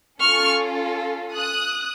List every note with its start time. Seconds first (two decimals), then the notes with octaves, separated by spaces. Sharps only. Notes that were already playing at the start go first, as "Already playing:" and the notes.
0.22 C#4 F4 A4 C#6 F6
1.34 D#6 F#6